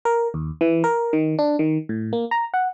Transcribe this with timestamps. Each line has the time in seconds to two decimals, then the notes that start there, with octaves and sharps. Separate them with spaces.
0.05 A#4
0.34 D#2
0.61 E3
0.84 A#4
1.13 D#3
1.39 D4
1.59 D#3
1.89 A2
2.13 A#3
2.31 A#5
2.54 F#5